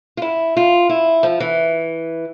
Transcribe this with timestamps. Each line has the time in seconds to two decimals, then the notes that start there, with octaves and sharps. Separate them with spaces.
0.17 F4
0.22 E4
0.57 F4
0.89 E4
1.23 F3
1.40 E3